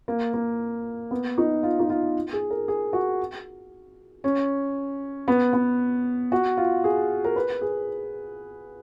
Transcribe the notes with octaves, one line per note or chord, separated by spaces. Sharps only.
A#3
A#3
B3
D#4
F4
D#4
F4
G#4
A#4
G#4
F#4
C#4
B3
B3
F#4
F4
G#4
A#4
B4
G#4